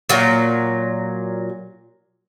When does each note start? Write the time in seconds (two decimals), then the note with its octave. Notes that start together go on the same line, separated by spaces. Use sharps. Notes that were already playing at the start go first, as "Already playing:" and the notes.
0.09 A#2 F#3